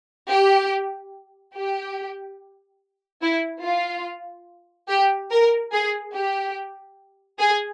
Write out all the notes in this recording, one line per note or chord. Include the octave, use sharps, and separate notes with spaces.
G4
G4
E4
F4
G4
A#4
G#4
G4
G#4